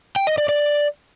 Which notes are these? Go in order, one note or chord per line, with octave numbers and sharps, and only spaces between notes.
G5
D#5
D5
D5